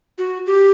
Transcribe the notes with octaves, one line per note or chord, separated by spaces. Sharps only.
F#4
G4